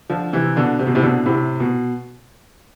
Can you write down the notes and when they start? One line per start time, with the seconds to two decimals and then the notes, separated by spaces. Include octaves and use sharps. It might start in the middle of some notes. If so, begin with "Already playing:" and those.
0.10 D3 F3
0.33 C3 E3
0.56 B2 D3
0.79 C3
0.87 B2
0.95 A2 C3
1.03 B2 D3
1.26 A2 C3
1.60 B2